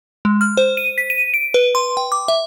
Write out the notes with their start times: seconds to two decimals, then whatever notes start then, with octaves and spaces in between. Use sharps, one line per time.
0.25 G#3
0.41 F6
0.57 C5
0.77 D#7
0.98 B6
1.10 D#7
1.34 D7
1.54 B4
1.75 C6
1.97 G5
2.12 D6
2.28 E5